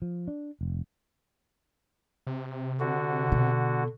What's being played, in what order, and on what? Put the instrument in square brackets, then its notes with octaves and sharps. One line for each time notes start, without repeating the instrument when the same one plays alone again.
[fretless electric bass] F3
D4
F1
[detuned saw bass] C3
[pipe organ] D3 F#4
[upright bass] B2